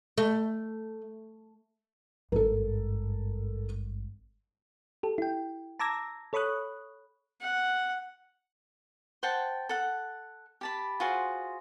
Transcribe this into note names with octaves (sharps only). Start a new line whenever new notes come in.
A3
G#1 G2 A4 A#4
G4 A4
E4 G5
A5 A#5 D6 E6 G#6 A#6
A4 C#5 B5 C#6 D#6 F#6
F#5
C5 F#5 G5 A5
A4 F#5
G4 A5 B5
F4 F#4 G#4 C5